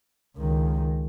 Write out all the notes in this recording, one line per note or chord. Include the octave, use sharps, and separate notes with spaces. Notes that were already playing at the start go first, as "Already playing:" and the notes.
C#2 D#3